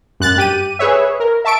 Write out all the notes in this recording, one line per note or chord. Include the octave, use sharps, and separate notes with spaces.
F#2 F#6 A6
G2 G4 D#7
G#4 B4 C#5 E5
A#4
E5 A5 C#6 D7